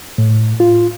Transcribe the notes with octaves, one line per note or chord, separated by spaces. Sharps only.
A2
F4